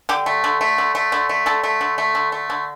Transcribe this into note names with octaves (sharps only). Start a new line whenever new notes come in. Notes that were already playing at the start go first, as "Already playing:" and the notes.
D3 G4
A3
D3
A3
D3
A3
D3
A3
D3 A4
A3
D3
A3
D3
A3
D3